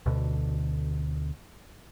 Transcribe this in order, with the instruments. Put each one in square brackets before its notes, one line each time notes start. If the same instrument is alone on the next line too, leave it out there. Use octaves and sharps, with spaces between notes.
[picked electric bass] D2 B2 D3